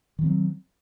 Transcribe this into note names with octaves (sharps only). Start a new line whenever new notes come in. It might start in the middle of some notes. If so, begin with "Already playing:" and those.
D#3 E3 F#3 C4